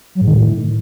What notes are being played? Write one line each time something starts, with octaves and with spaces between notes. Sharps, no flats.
F#3
G#2
D#3
A2